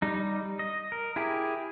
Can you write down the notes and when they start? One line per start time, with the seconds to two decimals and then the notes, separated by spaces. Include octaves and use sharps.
0.02 G3 D#4
0.59 D#5
0.92 A#4
1.16 E4 G4 G#4